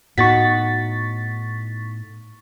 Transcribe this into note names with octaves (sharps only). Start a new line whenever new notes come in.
A2 B3 D#4 F#4 C#6 A6 B6